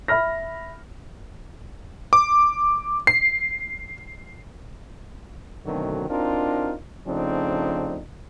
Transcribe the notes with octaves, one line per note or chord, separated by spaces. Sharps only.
E5 B5 F6 A#6
D6
C7
B2 D3 D#3 F#3 A3 C4
C4 D4 D#4 F4 F#4 A#4
C#3 F3 A3 C4 D4 D#4